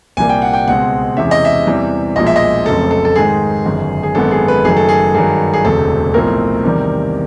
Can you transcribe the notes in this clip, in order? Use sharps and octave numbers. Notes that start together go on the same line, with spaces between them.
C2 A#2 G3 A#3 G#5
G5
F#5
G5
C#2 B2 G#3 C4 F#5
E2 C3 E3 G#3 C#4 E5
D#5
E5
E2 C3 E3 G3
B1 A#2 F3 G#3 D#5
E5
D#5
F1 F2 C#3 F#3 A3 A4
A4
A4
G#2 D#3 G#3 G#4
G1 F#2 D#3
G#4
G#1 F#2 D#3 G#3 B3 A4
G#4
B4
F#1 F#2 D#3 F#3 A3 G#4
A4
G#4
G2 D#3 F#3 G#4
G#4
E1 D2 C3 A4
B1 A2 F3 A3 C4 A#4
E2 C3 D#3 G3